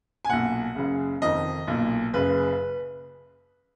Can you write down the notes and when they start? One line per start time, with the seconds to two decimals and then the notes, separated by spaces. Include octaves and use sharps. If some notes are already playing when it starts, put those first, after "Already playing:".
0.25 G#5
0.29 B1 A#2 F#5
0.75 F#1 F#2 C#3
1.22 F1 F2 D#3 D#5
1.67 B1 A#2
2.13 F#1 F#2 C#3 B4